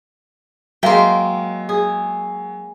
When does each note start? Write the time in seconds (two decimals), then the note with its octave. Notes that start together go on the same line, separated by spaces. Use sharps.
0.83 F#3 G#3 A#3 A#4 E5 F5 G5 C6
1.69 G#4